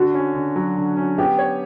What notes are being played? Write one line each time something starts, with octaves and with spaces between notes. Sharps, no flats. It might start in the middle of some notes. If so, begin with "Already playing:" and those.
Already playing: D3 F#4
C#4
D3
F#3
D3
C#4
B3 G4
C#5